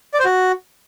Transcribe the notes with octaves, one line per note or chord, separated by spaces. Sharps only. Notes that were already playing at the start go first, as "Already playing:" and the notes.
D5
C5
F#4